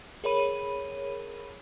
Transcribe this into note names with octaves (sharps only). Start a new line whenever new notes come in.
G#4 A#4 C#5 B5 D#7